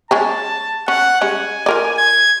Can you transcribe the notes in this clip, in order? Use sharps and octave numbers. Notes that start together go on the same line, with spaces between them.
G#3 C#4 G#4 A5
C#4 F#5
G3 G#3 C#4 G#5
F4 A#4 D5
G#6